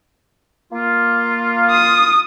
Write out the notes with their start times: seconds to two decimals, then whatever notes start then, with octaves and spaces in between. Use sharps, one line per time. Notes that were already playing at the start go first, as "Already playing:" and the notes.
0.72 A#3 F4
1.70 D#6